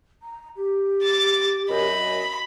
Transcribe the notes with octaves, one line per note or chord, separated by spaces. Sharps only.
A#5
G4
D6 A6
F#2 D#5 B5